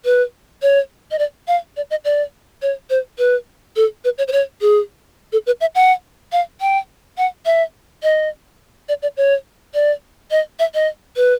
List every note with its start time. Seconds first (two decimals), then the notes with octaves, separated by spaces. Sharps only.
0.05 B4
0.62 C#5
1.11 D#5
1.19 D5
1.48 F5
1.77 D5
1.90 D#5
2.05 D5
2.62 C#5
2.90 C5
3.18 B4
3.76 A4
4.04 B4
4.18 C#5
4.28 C5
4.32 C#5
4.61 G#4
5.33 A4
5.46 B4
5.61 E5
5.75 F#5
6.32 F5
6.61 G5
7.18 F#5
7.45 E5
8.03 D#5
8.89 D5
9.02 D5
9.17 C#5
9.74 D5
10.31 D#5
10.59 E5
10.74 D#5
11.16 B4